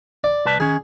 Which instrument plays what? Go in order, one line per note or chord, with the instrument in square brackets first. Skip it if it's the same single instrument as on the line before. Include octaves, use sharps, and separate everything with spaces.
[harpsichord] D5
[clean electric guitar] C2 B4 A5
[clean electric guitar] D#3 C#4 [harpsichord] G#4